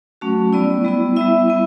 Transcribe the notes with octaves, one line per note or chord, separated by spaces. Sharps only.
F#3 A3 C#4 F#4
G3 B3 E4 D5
G3 B3 E4
G3 B3 E4 E5
B3 E4